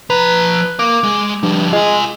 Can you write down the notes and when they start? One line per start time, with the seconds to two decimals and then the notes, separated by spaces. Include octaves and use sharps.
0.10 F3 B4 A#5
0.79 A#4 F5 D6
1.03 G#3
1.43 G2 D3 F3
1.73 G#3 F4 G#5